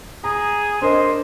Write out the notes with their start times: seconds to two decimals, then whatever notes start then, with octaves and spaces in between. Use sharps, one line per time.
0.24 G#4 A#5
0.81 D4 A#4 C5 D#5